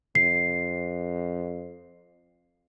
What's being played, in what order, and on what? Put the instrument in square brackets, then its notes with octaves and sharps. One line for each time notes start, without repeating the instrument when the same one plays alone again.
[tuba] F2 [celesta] C7